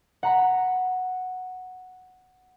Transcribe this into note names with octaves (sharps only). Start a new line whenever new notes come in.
F#5 A#5 B5